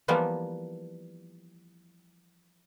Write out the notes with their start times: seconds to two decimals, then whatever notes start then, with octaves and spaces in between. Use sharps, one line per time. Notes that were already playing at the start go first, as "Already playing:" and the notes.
0.08 E3 F3 G3 A#3 B3